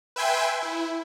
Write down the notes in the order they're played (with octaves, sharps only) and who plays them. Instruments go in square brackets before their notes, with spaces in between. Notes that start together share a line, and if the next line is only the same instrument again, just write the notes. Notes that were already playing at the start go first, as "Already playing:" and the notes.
[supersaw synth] B4 E5 G5 G#5 C6
E4